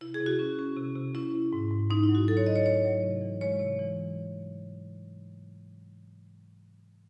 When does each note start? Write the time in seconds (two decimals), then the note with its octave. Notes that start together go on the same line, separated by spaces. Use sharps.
0.01 C3 E4
0.14 G#4
0.20 C3
0.26 F#4
0.39 C#4
0.59 C#4
0.77 C3
0.96 C3
1.15 C#4 E4
1.33 C3
1.53 G#2
1.71 G#2
1.91 G#2 D#4
2.03 E4
2.09 F#3
2.15 F#4
2.28 F#3 A4
2.37 C#5
2.46 G#2 D#5
2.56 C#5
2.66 A3 C#5
2.85 F#3
3.03 C3
3.21 E3
3.41 G#3 C#5
3.60 C3
3.79 E3